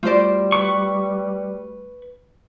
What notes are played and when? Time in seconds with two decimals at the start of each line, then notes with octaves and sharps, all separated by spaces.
0.03 G3 A3 F4 F#4 C5 D5
0.52 B4 C#6